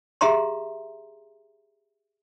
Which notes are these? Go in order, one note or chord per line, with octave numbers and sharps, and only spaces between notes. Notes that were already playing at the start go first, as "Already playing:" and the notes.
G4 G#4 E5 F5 A#5 C6